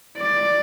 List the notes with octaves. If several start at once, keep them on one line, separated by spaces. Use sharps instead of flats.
D5